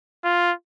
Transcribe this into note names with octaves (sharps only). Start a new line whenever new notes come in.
F4